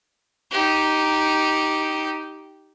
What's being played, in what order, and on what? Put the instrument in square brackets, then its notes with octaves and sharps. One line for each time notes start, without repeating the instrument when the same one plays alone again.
[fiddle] D#4 G4